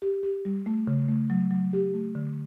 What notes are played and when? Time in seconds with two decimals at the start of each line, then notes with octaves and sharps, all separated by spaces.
0.02 G4
0.23 G4
0.45 G3
0.66 A3
0.87 C#3
1.09 A3
1.30 F#3
1.51 F#3
1.73 G4
1.94 A3
2.15 D3